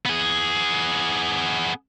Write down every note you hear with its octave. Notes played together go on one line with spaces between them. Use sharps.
B3 G#4